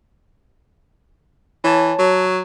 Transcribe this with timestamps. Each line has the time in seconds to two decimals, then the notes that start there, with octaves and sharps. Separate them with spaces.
1.64 E3 C#5 A5
1.99 F#3